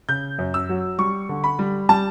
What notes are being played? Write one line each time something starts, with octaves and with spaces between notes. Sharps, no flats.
C#3 G6
F#2
E6
F#3
G3 C#6
D3
B5
G3
G3 A5